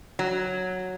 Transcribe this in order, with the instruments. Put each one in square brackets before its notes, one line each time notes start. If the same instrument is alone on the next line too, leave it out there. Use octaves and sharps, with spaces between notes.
[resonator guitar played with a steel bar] F#3